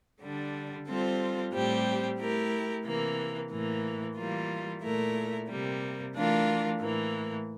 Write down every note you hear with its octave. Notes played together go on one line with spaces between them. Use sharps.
D3 G3 D4
G3 C4 F4 A4 C5
A2 G3 C4 G4
A3 E4 G4 A#4
C3 E3 A#3
A2 E3 A#3
E3 G3 A#3 F4
A#2 A3 E4 A#4
C3 G3 A#3
E3 A3 D4 F4 A#4
A2 E3 A#3